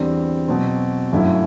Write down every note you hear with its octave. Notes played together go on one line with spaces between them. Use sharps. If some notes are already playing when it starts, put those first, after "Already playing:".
Already playing: E2 D3 G3 C4
B2 F#3 C4
G1 F#2 F#3 A3 E4